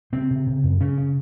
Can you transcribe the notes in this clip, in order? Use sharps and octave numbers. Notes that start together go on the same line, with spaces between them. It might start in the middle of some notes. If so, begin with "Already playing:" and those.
C#3 C4
C#3
C#3
F#2
C#3 C#4
C#3